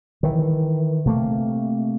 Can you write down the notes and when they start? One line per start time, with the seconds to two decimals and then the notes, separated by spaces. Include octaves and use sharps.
0.23 D#3 E3
1.06 C3 A3 A#3